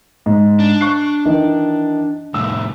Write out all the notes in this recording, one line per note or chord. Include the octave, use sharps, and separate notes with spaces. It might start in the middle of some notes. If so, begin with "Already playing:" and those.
G#2
D4
C#6 F#6 C7
D#3 E3 D#4
C2 A2 E6